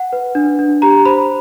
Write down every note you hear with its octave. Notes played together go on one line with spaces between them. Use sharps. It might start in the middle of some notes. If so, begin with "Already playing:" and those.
Already playing: F#5
B4
D4
D4
G4 A#5
C5 B5